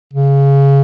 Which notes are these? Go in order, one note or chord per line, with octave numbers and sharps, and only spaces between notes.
C#3